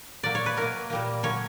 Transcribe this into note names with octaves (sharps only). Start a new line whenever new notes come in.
A#2 F#3 A#3 D5
C#5
B4
B2 F#3 A#3 A#4
A#2 G3 A#3
D3 F#3 A#3 C#5